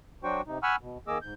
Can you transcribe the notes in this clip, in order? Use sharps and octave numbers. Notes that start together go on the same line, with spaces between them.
F#3 D4 F#4 C5 G5 C#6
C3 D#4
F#5 G#5 B5 C#6 E6 F6
B2
D#3 A#3 G#4 D#5 D6 E6
G#2 G6